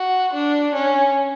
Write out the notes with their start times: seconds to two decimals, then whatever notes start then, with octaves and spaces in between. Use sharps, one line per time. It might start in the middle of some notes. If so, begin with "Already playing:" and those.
Already playing: F#4
0.33 D4
0.74 C#4